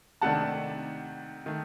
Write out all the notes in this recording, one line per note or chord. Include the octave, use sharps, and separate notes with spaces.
C3 D#3 A3 D4 F#5 A5
D#3 A3